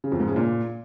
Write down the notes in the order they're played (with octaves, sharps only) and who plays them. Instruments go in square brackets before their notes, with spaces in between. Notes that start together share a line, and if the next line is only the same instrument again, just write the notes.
[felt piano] C#3
F2
G#2
C#3
A#2